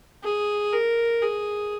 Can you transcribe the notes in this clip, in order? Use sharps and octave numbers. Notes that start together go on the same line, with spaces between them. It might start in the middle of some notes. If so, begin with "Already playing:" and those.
G#4
A#4
G#4